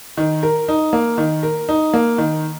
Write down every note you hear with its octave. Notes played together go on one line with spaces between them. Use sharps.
D#3
A#4
D#4
A#3
D#3
A#4
D#4
A#3
D#3